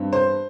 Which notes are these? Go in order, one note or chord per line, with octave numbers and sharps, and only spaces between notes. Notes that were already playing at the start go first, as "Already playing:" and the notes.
Already playing: G2 C4
C5